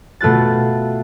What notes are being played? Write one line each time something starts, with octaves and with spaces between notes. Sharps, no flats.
B2 A3 F4 F#6 A6